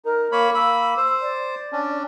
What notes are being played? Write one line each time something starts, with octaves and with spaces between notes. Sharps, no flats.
D#4 A#4
A#3 C#5 B5
A#3 B5 E6
C5
D5
C#4 D4